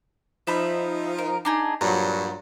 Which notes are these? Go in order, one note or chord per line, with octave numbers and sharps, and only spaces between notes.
F3 D#4 E5 B5
A#4
D4 D#4 G#4
G2 A#2 F#3 A#5